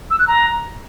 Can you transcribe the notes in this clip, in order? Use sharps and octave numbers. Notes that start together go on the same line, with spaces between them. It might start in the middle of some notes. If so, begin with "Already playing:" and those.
E6
F#6
A#5